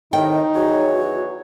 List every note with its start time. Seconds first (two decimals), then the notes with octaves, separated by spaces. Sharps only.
0.13 A2 C3 D#3 D#4 D#5 G5
0.55 E2 F#3 F#4 C#5